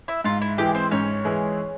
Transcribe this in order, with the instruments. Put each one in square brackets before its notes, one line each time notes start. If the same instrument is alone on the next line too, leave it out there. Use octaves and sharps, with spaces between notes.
[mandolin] E4 E5
[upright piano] G#2 [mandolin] F4
[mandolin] E4
[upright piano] E3 G#3 E4 G#4 [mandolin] G4
[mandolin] C4 C5
[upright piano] G#2 [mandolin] C#4 C#5
[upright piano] E3 G#3 E4 G#4